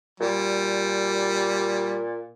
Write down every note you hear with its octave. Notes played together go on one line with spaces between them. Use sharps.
A#2 G3